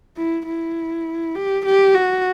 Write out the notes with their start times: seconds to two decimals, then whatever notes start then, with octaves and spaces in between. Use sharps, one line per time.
0.17 E4
0.46 E4
1.35 G4
1.65 G4
1.95 F#4